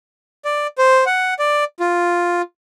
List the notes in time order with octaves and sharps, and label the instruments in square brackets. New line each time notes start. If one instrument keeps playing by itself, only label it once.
[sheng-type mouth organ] D5
C5
F#5
D5
F4